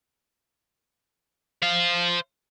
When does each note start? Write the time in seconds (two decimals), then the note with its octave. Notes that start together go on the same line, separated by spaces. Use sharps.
1.62 C5 F5